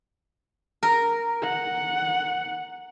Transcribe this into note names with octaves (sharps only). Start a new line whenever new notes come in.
A#4
F#5